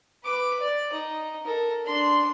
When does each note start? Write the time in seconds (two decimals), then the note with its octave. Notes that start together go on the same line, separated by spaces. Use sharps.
0.24 B4 D6
0.60 D5
0.92 D#4
1.44 A4 A#4
1.85 D4 C6